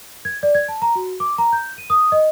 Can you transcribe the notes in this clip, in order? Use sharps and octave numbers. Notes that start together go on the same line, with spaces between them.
G#6
D5
G#6
A5
A#5
F#4
D6
A#5
G6
D#7
D#6
D#5